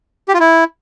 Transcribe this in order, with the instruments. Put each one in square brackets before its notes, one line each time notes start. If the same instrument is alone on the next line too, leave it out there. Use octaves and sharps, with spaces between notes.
[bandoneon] G4
F4
E4